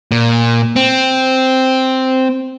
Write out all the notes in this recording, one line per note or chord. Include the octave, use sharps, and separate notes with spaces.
A#2
C4